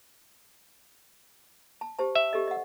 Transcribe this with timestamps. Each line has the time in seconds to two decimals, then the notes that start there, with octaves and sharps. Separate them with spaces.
1.81 A5
1.99 G4 C5 A5
2.15 E5
2.33 G4 A4 D#5
2.48 D#5 F#5